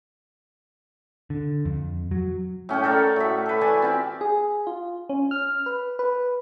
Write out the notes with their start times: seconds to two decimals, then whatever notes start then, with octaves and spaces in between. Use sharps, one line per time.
1.30 D3
1.65 F2
2.11 F#3
2.69 A2 C#4 F#5 G5
2.84 A4 A#4 C#5 D5
3.16 A2 F#4 E5
3.46 A4 B4
3.61 E3 D5 G#5
3.82 C4 F4 G4
4.21 G#4
4.67 F4
5.09 C#4
5.31 F6
5.66 B4
5.99 B4